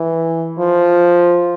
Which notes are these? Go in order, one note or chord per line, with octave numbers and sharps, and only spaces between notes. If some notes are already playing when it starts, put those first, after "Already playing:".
Already playing: E3
F3